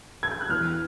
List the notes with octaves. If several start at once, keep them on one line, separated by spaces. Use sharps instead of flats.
G#6
G6
F#6
E2 F6